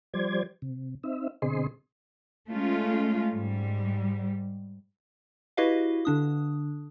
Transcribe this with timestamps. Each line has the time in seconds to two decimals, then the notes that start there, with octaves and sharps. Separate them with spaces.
0.14 F3 G3 C5 D5 G#6
0.62 C3
1.04 C4 D#4 E5
1.42 B2 D3 C4 G#4 D#5 C6
2.51 G#3 A3 C#4 F4
3.32 G#2 G3
5.57 E4 F#4 G4 B4 D#5 F5
6.05 D3 D4 D#6